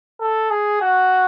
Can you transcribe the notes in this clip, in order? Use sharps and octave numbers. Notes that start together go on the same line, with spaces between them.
A4
G#4
F#4